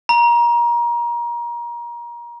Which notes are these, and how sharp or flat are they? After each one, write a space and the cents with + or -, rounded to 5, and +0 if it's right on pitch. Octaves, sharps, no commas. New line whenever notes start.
A#5 +30